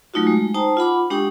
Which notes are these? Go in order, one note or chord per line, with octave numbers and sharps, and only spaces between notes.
F#3 A3 D#4 F4 F#4
G#3
D#4 C5 G5 A5 A#5 D#6
F4 F#5 B5 D6
G#3 D4 G4 G5 C#6 D#6